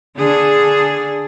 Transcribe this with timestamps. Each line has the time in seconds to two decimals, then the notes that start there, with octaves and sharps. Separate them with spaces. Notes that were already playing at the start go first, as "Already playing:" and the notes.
0.17 D3 D4 G#4